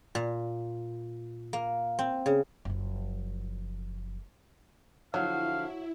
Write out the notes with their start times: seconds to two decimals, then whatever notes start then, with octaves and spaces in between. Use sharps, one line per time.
0.15 A#2
1.53 A#3
1.99 C4
2.26 C#3
2.65 F#1 F3
5.14 D3 F3 F#3 E4 F5